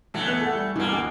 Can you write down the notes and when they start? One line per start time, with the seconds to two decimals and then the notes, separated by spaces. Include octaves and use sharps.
0.14 B1 E3 A3
0.27 B3 F#6 F7
0.41 A4 F#5
0.55 G3
0.76 C2 G2 B2 E3 A#3
0.88 D2 D6